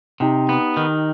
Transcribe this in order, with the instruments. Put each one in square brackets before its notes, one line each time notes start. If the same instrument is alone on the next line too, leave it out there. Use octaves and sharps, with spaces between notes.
[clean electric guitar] C3 [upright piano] D#4 G4
[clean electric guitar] B3
D#3